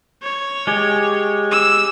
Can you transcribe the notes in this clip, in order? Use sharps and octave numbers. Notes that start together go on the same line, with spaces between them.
C#5
G#3 G4 G#5
E6